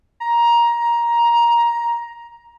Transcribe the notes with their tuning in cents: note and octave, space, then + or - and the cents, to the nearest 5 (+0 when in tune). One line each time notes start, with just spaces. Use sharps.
A#5 +15